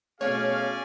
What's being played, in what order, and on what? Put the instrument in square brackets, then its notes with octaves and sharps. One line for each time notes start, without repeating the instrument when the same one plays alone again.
[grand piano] B2 A3 [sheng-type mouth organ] C#4 D5 G#5 [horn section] G#4 F5 [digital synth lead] C#5